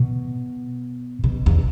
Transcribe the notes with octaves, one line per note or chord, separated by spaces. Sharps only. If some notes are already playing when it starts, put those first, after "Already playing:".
Already playing: B2
B2
E2